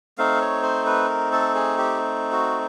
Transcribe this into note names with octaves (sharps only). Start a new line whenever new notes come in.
A3 C4 D#4 F5
C#5
C5
B4
A#4
A4
G#4
G4
F#4